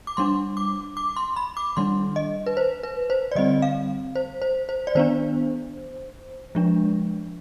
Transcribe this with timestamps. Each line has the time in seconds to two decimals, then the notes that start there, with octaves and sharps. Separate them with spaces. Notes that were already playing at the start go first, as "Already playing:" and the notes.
0.07 D6
0.17 G3 D4 C6
0.57 D6
0.97 D6
1.16 C6
1.36 B5
1.57 D6
1.77 D#3 G3 D4 C6
2.16 D#5
2.46 B4
2.57 C5
2.83 B4
3.10 C5
3.32 D5
3.35 D3 G3 C4 D#5
3.62 F5
4.15 C5
4.42 C5
4.69 C5
4.87 D5
4.95 D#3 B3 D4 C5
6.55 F3 G#3 D4